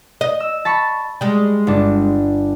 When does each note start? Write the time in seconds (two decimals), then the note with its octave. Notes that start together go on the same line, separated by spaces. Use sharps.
0.21 D#5
0.40 E6
0.65 A5 B5 C#6
1.21 G3 G#3
1.67 G1 D4